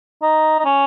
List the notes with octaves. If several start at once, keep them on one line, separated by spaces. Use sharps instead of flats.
D#4
D#4
C#4